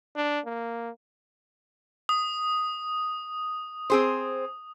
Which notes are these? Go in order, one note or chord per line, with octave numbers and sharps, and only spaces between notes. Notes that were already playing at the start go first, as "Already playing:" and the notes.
D4
A#3
D#6
C4 G#4 C5